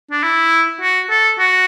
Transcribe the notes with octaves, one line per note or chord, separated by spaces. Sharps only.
D4
E4
F#4
A4
F#4